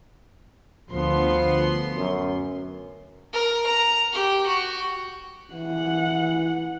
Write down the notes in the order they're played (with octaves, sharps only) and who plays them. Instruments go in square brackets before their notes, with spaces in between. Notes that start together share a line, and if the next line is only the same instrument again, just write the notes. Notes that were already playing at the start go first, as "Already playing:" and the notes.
[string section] D2 B3 C6 [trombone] F3
[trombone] F#2
[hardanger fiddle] A#4
A#5
G4
F#4
[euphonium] E3 [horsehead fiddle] F#5